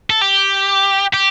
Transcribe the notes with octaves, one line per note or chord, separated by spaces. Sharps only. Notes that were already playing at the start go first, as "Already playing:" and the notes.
A4
G4
G4